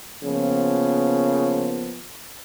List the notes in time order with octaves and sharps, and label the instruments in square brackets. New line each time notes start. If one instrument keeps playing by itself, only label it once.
[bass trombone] C#3 [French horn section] F3 A#3 B3